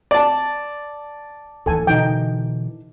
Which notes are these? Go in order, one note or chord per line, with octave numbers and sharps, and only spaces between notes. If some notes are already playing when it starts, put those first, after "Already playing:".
D5 A5
D1 D#2 E3 A4 G#5
B2 D3 E3 D#4 G5